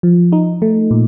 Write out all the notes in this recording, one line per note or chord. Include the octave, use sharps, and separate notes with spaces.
F3
D#4
A3
A#2